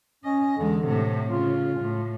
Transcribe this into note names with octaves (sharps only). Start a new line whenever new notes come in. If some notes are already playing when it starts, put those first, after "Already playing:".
C#4 D#5
E2 D3 G#3
A2 C3
C#3 F4
A2